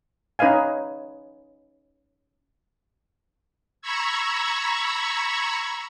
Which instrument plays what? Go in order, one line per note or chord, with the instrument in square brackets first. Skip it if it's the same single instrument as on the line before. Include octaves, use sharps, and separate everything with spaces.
[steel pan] C#4 D#4 B4 D#5 F5 G#5
[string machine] A#5 B5 C#6 E6 G#6